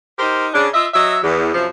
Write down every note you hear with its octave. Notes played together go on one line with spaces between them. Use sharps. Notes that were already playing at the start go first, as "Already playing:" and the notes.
D#4 G4 A#4 C5
C#3 D4
F4 D#5 E5
F#3 D#5 E5
E2
F#2 C3 F3